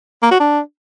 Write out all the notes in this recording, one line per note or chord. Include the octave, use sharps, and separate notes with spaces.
A#3
F#4
D4